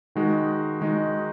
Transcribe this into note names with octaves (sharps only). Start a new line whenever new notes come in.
D#3 G#3 D#4 F#4
D#3 G#3 D#4 F#4